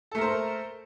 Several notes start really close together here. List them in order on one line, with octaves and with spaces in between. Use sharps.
A4 A3 A#4 C5